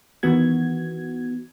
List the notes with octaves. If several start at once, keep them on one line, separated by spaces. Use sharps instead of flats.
D#3 E3 B3 F#4 G#6